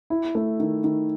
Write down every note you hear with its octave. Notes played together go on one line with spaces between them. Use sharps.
E4
A3
D#3
D#3